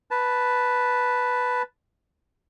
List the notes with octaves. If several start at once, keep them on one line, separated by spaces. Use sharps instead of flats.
B4 A5